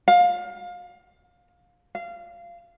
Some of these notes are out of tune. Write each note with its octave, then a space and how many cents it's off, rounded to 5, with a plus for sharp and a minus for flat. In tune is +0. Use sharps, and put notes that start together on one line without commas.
F5 +25
F5 -20